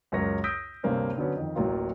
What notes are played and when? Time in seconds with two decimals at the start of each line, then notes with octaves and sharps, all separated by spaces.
0.12 C#2 F#2 A#4 C#5 A#6
0.44 D#6 E6 G6 A#6 B6 D7
0.83 D2 G2 C3 A#3 C4 C#4
1.18 D3 F#3 B3 C#4
1.36 F2 D#3
1.56 D1 A1 F#3 A#3 F4